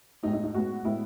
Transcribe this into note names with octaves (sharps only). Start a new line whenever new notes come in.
A2 G#3 B3 D#4
D#4
D#4
A2 G#3 B3 F#4
A2 G#3 B3 E4